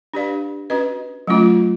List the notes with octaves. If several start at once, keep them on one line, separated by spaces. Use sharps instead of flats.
D4 G4 B4 D5 F5
C#4 F#4 B4 D#5
F#3 A3 C#4 F4